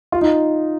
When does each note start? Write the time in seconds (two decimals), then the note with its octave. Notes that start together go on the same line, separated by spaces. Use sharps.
0.12 F4
0.21 D#4